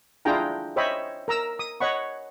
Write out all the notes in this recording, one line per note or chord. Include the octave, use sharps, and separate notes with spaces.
D4 E4 F4 G#4 G5 A#5
C5 C#5 D#5 E5 G5 B5
A#4 A#5 E6
D#6
C#5 D#5 F#5 B5 C#6